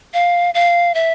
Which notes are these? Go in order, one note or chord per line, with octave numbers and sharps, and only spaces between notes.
F5
F5
E5